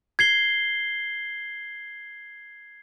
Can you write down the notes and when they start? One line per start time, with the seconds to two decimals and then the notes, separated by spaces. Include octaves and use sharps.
0.19 G#6 C7 G7